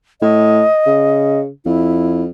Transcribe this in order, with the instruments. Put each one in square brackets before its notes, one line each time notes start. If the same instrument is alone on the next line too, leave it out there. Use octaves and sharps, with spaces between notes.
[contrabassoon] A2 [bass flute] D#5
[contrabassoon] C#3
[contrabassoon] F2 [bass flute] E4